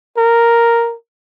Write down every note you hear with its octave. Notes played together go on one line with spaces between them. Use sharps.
A#4